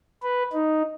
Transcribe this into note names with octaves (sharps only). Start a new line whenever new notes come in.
B4
D#4